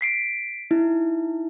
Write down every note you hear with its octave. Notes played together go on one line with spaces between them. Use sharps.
B6 C7 D7
D#4 E4